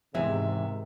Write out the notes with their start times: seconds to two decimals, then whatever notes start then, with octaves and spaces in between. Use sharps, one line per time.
0.15 E2 G#2 C3 D#3 E3 G#3 E5